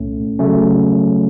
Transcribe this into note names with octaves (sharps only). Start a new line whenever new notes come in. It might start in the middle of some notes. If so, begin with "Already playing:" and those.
Already playing: C2 A#2 A3 C#4
C#3 F#3 A3 C#4